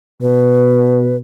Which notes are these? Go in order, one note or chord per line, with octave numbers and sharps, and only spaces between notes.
B2 B4